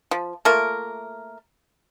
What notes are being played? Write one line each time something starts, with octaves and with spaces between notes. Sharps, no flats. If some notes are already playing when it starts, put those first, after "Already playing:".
F3
A3 A#3 F4 A#4